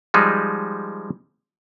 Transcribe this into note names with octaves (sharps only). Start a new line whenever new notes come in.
F3 G3 G#3 D#4